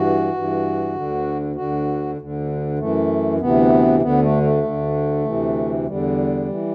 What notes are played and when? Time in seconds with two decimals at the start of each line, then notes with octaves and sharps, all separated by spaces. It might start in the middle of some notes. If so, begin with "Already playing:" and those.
Already playing: G2 E3 F#4
0.34 G2 E3
0.94 D2 D3
1.56 D2 D3 F#4
2.18 D2 D3
2.79 F#2 E3 A3
3.40 D2 C3 E3 B3
4.02 D2 D3 B3
4.22 A3
4.43 A3
4.63 D2 D3
5.25 D2 C3 E3
5.86 E2 D3 G3
6.48 E3